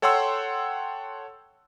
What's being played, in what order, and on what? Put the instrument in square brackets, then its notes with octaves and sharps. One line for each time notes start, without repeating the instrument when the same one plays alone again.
[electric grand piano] A4 C#5 F#5 G5 C6 E6